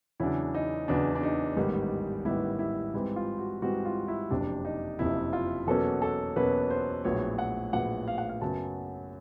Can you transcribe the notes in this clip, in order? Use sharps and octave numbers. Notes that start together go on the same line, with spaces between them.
E2 C#3 F#3 B3 D4 E4
D#4
E2 C#3 F#3 B3 D4
D4
D#4
A1 G#2 D#3 G3 B3
A1 G#2 D#3 G3 B3 E4
E4
G#2 E3 G3 C4 E4
F4
F#4
G#2 E3 G3 C4 F#4
F4
E4
F#1 F2 C3 D4
D#4
F#1 F2 C3 E4
F4
E2 B2 F#3 A#3 C#4 A4
A4
E2 B2 F#3 A#3 C#4 B4
C5
A#1 A2 F#3 B3 C#5
F#5
A#1 A2 F#3 B3 F#5
F5
F#5
F5
F#2 C#3 F#3 B3 A5